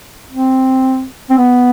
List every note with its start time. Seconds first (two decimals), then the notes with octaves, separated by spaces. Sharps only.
0.31 C4
1.30 C4
1.38 B3